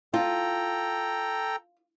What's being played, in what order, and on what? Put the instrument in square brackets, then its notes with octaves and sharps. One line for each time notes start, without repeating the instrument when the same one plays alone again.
[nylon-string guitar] F4 [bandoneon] A4 G5 A#5